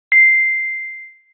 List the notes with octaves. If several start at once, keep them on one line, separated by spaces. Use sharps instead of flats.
C7